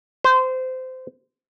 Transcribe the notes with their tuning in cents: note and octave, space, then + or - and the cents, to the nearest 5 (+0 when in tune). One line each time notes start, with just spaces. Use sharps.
C5 -20